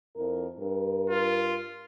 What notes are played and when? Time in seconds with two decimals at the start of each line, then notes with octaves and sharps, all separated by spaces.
0.16 F2 E4 A#4
0.58 G2 A#4
1.10 F4